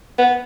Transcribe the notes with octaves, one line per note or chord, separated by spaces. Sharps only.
B3